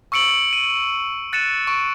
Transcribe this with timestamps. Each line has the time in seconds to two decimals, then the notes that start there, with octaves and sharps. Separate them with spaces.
0.12 C#6 E6 C#7 D7 F#7
0.53 D#7
1.33 F#6 A6 C#7 D#7 E7
1.67 C#6 D7